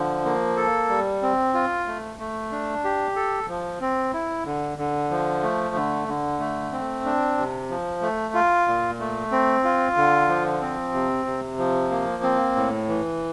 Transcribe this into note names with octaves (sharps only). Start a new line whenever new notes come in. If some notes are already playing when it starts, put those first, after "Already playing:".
Already playing: D3 F3
A#3
A4
G3
C4
F4
A3
A3
D4
G4
A4
F3
C4
E4
D3
D3
F3
A3
D3
D3
A3
C4
D4
C3
F3
A3
F4
A#2
A3
C4
F4
D3
F3
C4
C3
C3
F3
A#3
C4
A2
E3